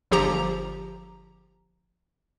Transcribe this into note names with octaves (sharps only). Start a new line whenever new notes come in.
G1 F3 G4 A#5